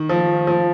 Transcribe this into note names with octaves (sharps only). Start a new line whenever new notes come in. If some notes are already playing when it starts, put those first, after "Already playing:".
Already playing: D#3
F3
F3